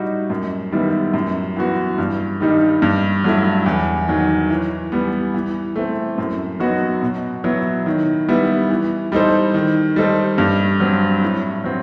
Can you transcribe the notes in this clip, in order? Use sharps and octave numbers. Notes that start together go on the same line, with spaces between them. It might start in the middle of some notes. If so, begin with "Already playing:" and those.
Already playing: A2 G3 D#4 F#4
F#2
D#3 G3 B3 E4
F#2
E3 B3 F#4
G2
D#3 G3 D#4
G2
F#3 A3 E4
E2
D#3 F#3
E3
G3 B3
E3
A3 C4
F#2
F#3 B3 D#4 F#4
B2
F#3 B3 E4
D#3
G3 B3 E4
E3
G3 D#4 A4 C5
D#3
G3 D#4 A4 C5
G2
F#3 C4
A2
F#3 C4